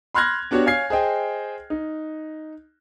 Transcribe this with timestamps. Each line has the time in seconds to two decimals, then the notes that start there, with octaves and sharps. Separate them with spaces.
0.14 B5 C6 F6 F#6 G#6 A#6
0.51 B3 D4 F#4 G4 C#5
0.66 C#5 F5 G#5 F6 G#6 C7
0.90 G#4 C5 D#5 G5
1.70 D#4